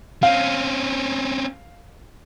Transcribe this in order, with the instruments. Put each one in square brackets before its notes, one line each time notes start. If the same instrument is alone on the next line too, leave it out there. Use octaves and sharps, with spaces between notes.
[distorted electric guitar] C4 C#4 [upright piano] F5